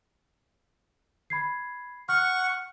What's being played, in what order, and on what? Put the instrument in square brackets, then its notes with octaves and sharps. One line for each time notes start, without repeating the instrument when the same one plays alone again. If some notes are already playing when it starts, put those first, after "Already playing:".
[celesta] B5 G#6 C7
[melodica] F#5 C#6 [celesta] F6